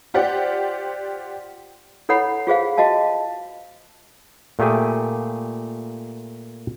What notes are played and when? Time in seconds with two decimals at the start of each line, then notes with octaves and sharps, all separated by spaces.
0.14 F4 G4 C5 D5 F#5
2.09 E4 A4 C#5 F#5 B5
2.47 F4 G#4 C5 F5
2.78 F#4 D#5 F5 A5
4.59 A#2 A3 G4 G#4 G#5